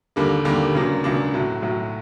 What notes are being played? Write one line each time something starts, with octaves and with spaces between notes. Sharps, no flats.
D#2 D3 G3 A#3
D#2 D3 G3 A#3
C#2 C#3 F#3 A#3 D4
C#2 C#3 F#3 A#3 D4
B1 A2 F#3
B1 A2 F#3